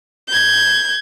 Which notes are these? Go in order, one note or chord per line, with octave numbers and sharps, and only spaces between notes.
G6 G#6